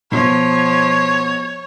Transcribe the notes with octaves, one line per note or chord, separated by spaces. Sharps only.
B2 F3 C#5